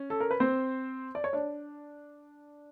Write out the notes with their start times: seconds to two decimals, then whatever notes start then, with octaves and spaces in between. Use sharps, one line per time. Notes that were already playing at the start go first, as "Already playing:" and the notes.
Already playing: C#4
0.10 A4
0.21 A#4
0.31 B4
0.40 C4 C5
1.15 D5
1.24 C#5
1.33 D4 D5